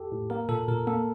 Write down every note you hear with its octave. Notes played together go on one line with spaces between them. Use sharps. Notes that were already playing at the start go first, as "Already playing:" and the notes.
Already playing: G4 A4
A2
A#3 A#4
A#2 A4
A#2 A#4
A#3 A4